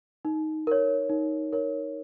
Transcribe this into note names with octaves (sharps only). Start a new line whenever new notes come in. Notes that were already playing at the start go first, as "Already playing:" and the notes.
D#4
A#4 C#5
D#4
A#4 C#5